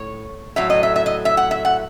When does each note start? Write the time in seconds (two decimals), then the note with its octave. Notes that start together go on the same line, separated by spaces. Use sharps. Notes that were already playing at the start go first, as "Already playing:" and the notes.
Already playing: A2 C#5
0.56 A2 F#3 E5
0.70 D#5
0.83 E5
0.96 E5
1.06 D#5
1.25 E5
1.37 F#5
1.51 E5
1.65 F#5